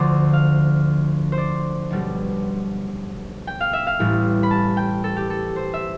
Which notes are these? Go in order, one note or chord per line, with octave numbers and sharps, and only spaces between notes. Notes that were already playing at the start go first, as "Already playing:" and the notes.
Already playing: D2 D3 F3 C5 D5
F5
C5
D5
B1 B2 G3
G5
F5
E5
F5
A1 A2 G3
B5
A5
G5
A4
G4
A4
C5
E5